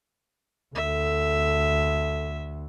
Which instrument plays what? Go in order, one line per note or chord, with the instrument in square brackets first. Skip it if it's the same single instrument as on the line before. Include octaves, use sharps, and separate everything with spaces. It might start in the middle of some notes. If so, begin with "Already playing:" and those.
[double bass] D2 [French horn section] A4 [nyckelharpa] E5